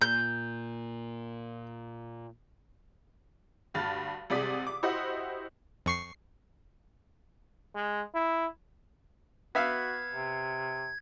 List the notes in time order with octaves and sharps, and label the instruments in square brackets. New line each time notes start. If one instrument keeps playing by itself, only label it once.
[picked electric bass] A#2 [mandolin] G6
[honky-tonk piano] D2 G2 F6 A6
C2 C3 G#3 D5 D#6 B6
D6
E4 F#4 G4 C5 D#5 F#5
[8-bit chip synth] F2 C#6 C7
[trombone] G#3
E4
[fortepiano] B3 E5 F5 [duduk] F#4 [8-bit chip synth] G#6
[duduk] C3